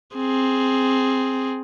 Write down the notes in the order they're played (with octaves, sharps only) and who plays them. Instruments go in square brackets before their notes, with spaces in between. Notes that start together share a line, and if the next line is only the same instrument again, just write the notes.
[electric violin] C4 G#4